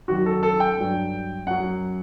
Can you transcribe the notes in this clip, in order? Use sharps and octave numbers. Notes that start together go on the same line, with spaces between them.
F#2 D#3 F#3 F#4
A4
A4
G5
G2 F#3
F#2 F#3 F#5